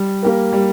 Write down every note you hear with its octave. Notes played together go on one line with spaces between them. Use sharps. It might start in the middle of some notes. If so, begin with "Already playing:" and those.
Already playing: G3
A#3 G4 A#4
G3